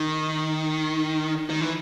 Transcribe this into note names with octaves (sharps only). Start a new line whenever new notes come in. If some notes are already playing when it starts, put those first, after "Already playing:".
Already playing: D#3
D#3
E3